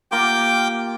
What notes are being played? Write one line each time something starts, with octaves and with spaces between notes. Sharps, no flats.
A#3 F4 G4 G5 D6 G6